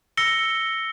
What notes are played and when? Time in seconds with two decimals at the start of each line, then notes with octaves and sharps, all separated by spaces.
0.17 E6 A#6 C#7 G7